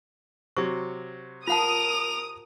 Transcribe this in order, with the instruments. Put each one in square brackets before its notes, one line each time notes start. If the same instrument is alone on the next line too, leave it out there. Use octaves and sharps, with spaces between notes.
[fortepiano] C3 F#3 [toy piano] C#6
[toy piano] F4 F#5 A5 [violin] A#4 F7 [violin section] D#6